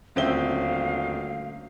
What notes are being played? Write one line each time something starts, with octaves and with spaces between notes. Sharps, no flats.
D#1 D2 C4 C#4 E5 F5 G7